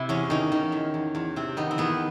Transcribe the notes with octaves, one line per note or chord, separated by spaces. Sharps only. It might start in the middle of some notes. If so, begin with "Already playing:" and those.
Already playing: C3 E4
E2 C#4
D#3 C#4
D#3
E2
E2
E2
C3 C4
D#3 B3
C4
E2 B3